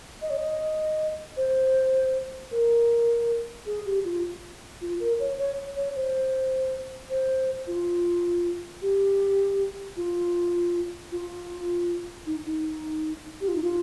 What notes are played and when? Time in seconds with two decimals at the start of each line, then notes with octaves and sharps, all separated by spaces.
0.22 D#5
0.30 C#5
0.38 D#5
1.37 C5
2.52 A#4
3.66 G#4
3.86 G4
4.04 F4
4.81 F4
5.00 A#4
5.20 C#5
5.38 C#5
5.76 C#5
5.96 C5
7.10 C5
7.67 F4
8.82 G4
9.97 F4
11.12 F4
12.26 D#4
12.46 D#4
13.41 G4
13.48 F4
13.55 D#4
13.63 F4